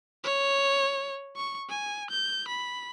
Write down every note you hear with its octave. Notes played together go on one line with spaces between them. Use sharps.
C#5
C#6
G#5
G6
B5